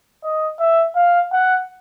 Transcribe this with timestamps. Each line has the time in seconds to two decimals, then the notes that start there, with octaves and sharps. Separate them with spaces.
0.23 D#5
0.60 E5
0.96 F5
1.33 F#5